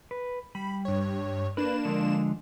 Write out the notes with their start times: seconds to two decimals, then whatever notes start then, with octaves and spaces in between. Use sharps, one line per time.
0.11 B4
0.55 G3 B5
0.85 G2 C#5
1.57 A#3 D4 B4 E7
1.85 D3 F3 G#3